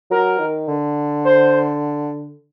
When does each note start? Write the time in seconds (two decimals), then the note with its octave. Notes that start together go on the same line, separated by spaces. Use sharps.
0.11 F#3 A#4
0.39 D#3
0.68 D3
1.25 C5